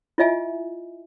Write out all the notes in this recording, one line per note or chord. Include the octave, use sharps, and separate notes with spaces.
E4 F4 D#5 E5 G#5